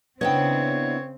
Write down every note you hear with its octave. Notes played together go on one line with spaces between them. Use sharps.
C#3 B3 C4 D4 E4 C#5 D#5 G5